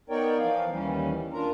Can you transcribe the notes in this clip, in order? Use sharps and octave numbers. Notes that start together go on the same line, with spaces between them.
B3 D#4 A#4 C#5 D5 G5
E3 F3 F5
D#2 E3 G3 C#4
D4 F4 A#4 A#5